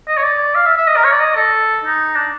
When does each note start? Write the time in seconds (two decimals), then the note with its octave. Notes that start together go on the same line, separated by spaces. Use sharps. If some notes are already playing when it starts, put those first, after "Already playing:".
0.08 D#5
0.18 C#5
0.24 D5
0.55 F5
0.66 E5
0.77 E5
0.87 D#5
0.96 A#4
1.04 C#5
1.12 D5
1.20 D#5
1.36 A4
1.84 D#4
2.16 D4